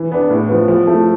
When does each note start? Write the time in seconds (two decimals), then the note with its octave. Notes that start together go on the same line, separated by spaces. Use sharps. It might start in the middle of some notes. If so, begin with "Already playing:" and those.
Already playing: E3
0.12 B3 D4
0.30 A2
0.49 F3 B3
0.68 F3
0.87 A3 E4 A4